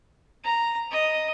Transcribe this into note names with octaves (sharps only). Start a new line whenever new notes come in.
A#5
D#5